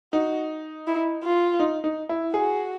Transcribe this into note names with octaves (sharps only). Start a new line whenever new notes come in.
D#4 F#4
E4
F4
D#4
D#4
E4
F#4 G#4